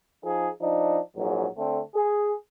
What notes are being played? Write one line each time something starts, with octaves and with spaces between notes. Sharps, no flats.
F3 D#4 G#4
F3 D4 D#4
A#1 G#2 F#3
D3 A3 C4
G#4